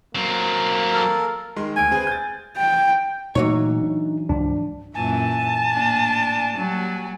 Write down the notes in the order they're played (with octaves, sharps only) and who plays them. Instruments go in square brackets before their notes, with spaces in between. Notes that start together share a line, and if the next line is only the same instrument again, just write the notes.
[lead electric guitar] F#3 C4 [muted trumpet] A#3
[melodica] A4 A#4 F5
[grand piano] D#3 G#3 C6
[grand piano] D2 D7 [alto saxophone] G#5
[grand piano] C4 G#4 B4
G6 A6
[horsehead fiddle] G5
[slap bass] A#2 A3 [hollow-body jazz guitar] E3 F#3 C#5 [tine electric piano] D#4
[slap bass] D4
[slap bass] C#2 G#2 F3 [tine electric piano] D4
[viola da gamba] F#2 A#2 E3 [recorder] G#5 [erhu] A5
[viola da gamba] A2 A#3 D4
F#3 G3 A#3